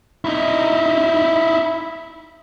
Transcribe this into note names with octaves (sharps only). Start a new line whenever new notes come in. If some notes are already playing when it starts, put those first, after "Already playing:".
D#4 E4